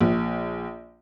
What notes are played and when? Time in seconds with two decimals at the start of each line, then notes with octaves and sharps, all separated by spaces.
0.01 A#1